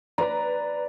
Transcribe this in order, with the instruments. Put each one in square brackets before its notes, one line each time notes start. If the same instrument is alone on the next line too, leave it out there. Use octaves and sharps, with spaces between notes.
[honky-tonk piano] B4 A#5 [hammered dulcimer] D5